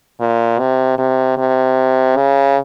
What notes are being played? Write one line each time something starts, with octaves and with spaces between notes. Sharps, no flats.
A#2
C3
C3
C3
C#3